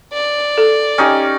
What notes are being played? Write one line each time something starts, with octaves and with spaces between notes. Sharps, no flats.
D5
A4
C#4 D#4 G4